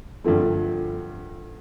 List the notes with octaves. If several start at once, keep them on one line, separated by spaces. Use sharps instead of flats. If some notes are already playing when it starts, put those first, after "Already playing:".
G2 D3 F3 A3